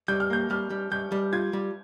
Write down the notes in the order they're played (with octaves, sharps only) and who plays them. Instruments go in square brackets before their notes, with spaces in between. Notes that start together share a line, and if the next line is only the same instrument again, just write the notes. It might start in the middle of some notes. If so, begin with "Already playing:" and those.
[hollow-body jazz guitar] G3 [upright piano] G6
[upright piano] F6
[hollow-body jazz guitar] A#3 [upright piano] G6
[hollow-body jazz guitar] G3 [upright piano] F6
[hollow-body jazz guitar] G3
[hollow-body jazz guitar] G3 [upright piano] G6
[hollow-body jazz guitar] G3
[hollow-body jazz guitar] F4 [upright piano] G#6
[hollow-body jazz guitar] G3